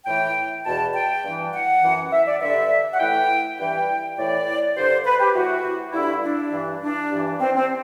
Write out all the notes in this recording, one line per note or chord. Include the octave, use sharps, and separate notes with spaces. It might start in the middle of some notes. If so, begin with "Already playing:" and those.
A2 E3 G5
E2 B2 A5
G5
G2 E3
F#5
F#2 E3
E5
D5
G2 D3 E5
F#5
A2 E3 G5
G2 E3 G5
A2 E3 D5
G2 D3 C5
B4
G4
A2 E3 F#4
G2 D3 E4
D4
G2 E3
D4
G2 E3
C4
C4